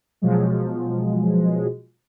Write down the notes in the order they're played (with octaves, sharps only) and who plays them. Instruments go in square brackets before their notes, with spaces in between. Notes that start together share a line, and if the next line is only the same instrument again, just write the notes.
[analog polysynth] B2 F3 F#3 G#3